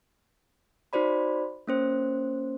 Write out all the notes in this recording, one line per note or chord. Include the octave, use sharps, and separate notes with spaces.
D#4 F#4 C5 D5 B5
A#3 C#4 C5